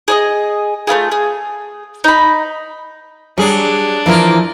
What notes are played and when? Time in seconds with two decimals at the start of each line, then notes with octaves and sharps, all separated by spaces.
0.08 G#4 D5 D#5
0.87 A3 B3 F4 G#4
1.12 G#4
2.04 D#4 B5
3.38 F#3 G3 D4 G#4
4.06 E3 F3 A#3 E4 A#4